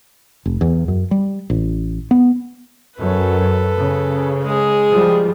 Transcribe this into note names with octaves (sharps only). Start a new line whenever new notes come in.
F1
E2
F#2
G3
A1
B3
F#2 F#3 A4 B4
C#3
G#3 G#4
F3 G3